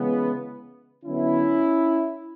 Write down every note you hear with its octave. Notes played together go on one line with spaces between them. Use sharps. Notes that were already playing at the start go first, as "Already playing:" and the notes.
Already playing: C#3 E3 G#3 B3
D3 F#3 B3 C#4 E4